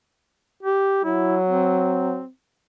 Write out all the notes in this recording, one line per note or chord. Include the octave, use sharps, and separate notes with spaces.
G4
F#3 E4
C4